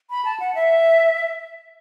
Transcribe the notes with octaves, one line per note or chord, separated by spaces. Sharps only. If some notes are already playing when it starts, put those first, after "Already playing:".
B5
A5
F#5
E5